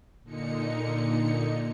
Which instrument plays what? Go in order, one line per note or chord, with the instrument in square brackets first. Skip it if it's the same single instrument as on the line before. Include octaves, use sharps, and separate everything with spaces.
[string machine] A#2 D3 D#4 C#7